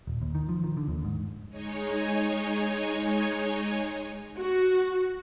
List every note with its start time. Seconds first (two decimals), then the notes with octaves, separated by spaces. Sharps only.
0.07 D#1
0.22 D#2
0.35 D#3
0.49 F3
0.64 D#3
0.77 D3
0.88 D#2
1.05 G#2
1.50 G#3 D#4 C#5 G#5
4.37 F#4